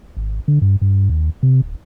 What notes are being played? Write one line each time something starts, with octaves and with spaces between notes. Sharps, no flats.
G#1
D3
G2
G2
D#2
C3
D1